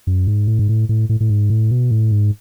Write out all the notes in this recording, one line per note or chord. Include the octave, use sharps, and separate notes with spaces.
F#2
G#2
A2
G#2
A2
A2
A2
A2
G#2
A2
B2
A2
G#2